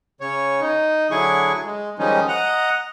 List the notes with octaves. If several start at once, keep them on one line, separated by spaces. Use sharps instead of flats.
C#3 C#5
D#4
D3 F#3 E4 G#4 C#6
G#3
D#3 F3 G3 G#3 C#4 D#4
D#5 F#5 A#5